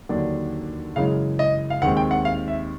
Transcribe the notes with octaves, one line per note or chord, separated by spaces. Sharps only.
D#2 D3 F#3 A#3 D4
F#2 C#3 E3 G#3 F5
D#5
F5
D#2 D#3 G#3 C4 F#5
G5
F#5
F5
E5